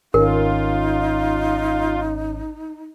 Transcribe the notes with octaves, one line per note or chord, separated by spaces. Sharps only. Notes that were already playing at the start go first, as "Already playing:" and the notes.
G#1 C#4 D#4 F4 A#4